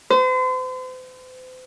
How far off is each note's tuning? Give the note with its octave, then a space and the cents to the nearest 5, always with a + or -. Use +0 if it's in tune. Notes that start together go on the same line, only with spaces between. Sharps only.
C5 -40